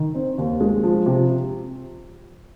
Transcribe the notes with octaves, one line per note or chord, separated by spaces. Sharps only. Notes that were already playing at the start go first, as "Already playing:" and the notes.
Already playing: D#3
C4
D#2
G#3
F3
C3